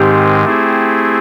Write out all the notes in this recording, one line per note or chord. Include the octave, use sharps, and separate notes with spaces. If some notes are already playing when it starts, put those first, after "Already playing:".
Already playing: G#2 D#3 G#3 C4 D#4 G4
A3 C4 E4 G#4